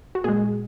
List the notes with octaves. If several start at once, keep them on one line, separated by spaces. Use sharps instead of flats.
F#4
A#2 G#3 G#4